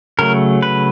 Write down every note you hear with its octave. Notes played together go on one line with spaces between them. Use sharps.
C#3 F#3 A3 A#4
B4